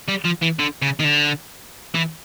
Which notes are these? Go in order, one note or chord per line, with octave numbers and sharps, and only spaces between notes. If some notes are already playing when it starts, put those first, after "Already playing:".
G3
F3
E3
D3
C#3
D#3
D3
E3